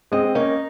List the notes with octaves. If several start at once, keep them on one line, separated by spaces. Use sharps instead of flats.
G#3 C4 D#5
C4
A#3 C#4 D#4